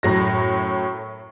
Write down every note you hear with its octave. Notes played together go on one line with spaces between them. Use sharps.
F#2 A2 F#3 A#6